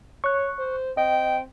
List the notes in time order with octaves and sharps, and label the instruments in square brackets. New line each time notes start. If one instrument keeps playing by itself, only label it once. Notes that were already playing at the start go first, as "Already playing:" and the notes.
[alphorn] C#5 [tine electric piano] C#6 F#6
[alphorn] C5
[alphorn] C4 [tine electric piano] D#5 [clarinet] G5